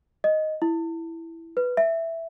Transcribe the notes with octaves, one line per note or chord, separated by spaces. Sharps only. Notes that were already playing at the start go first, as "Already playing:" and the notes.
D#5
E4
B4
E5